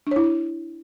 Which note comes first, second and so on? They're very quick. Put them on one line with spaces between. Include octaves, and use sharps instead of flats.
D4 C#5 E4